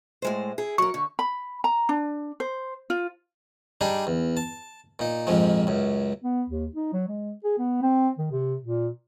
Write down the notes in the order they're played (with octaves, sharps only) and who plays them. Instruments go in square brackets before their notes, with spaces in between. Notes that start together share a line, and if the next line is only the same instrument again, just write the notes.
[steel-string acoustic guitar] A2 G#3 C5
E4 G#4
[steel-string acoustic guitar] F#3 A#4 [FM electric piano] C#6
[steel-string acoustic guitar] D3
[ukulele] B5
A#5
D4
C5
F4
[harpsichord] G3 D4 D#4 G#4
E2
A5
A#2 D#4
A#1 F2 G#2 F3 G#3
C#2 F#2
[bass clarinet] B3
D#2
D#4
F#3
G#3
G#4
B3
C4
D#3
C3
A#2